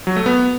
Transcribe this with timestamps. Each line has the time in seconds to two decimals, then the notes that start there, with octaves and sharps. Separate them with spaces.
0.07 F#3
0.16 A3
0.26 B3